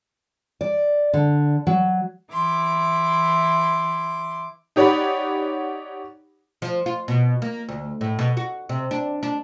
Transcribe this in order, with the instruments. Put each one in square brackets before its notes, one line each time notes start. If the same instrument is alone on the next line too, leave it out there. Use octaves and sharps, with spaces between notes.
[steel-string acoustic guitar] D5
D3
F#3
[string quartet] E3 E4 C6 D6
[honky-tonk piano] D#4 G4 C#5 D5 F#5 B5
[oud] F3
F4
B2
A#3
D2
A2
B2
F#4
C3
D4
D4